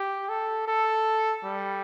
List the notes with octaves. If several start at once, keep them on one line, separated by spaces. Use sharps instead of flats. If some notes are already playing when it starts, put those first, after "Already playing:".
Already playing: G4
A4
A4
G3